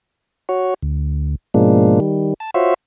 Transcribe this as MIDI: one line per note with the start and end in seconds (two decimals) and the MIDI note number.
0.49 0.74 66
0.49 0.74 73
0.83 1.35 38
1.54 2.00 44
1.54 2.00 47
1.54 2.00 53
1.54 2.00 56
1.54 2.00 58
1.54 2.00 62
2.00 2.34 51
2.00 2.34 55
2.40 2.50 81
2.54 2.74 65
2.54 2.74 66
2.54 2.74 72
2.54 2.74 73
2.54 2.74 76